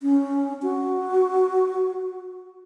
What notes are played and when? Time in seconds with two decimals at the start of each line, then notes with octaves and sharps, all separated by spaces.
0.03 C#4
0.63 F#4